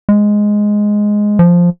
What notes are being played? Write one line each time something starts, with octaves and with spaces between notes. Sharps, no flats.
G#3
F3